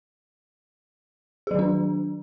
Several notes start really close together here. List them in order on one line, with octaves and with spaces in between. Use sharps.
G#4 F#3 D#3 D4